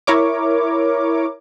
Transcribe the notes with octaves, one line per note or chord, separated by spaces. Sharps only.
E4 A#4 C#5 D6